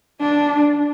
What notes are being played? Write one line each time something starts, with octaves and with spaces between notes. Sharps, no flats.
D4